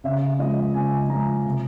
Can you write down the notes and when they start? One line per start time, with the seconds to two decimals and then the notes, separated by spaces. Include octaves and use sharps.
0.04 C#3 E5
0.39 F3 G#3 D#5
0.74 C#3 G#5
1.10 F3 G#3 A#5
1.45 C3